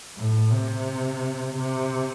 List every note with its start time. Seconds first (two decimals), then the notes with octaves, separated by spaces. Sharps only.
0.17 A2
0.52 C3
1.57 C3